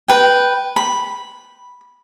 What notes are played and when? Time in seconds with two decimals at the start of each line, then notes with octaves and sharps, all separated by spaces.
0.08 B4 G5
0.76 B5